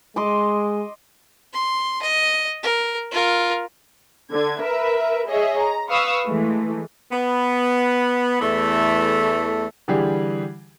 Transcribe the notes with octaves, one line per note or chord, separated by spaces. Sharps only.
G#3 D#5 C6 D6
C6
D#5
A#4
F4 A#4
D3 G#6
A#4 B4 E5
G#4 C#5 D#5 E5
A#5
B4 F5 C#6 D#6 E6
E3 G#3 A3
B3
E2 E3 A3
D3 E3 G3 G4 G#4